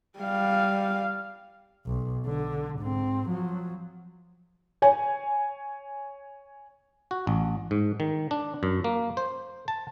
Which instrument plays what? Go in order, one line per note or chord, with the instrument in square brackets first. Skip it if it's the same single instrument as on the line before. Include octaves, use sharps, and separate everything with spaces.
[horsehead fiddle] G3 F5
[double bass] B1
D3
G#2 C4
F3 F#3
[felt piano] C#5 G#5
[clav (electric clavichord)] F#4
A1
G#2
D#3
D4
F#2
A#3
C5
A5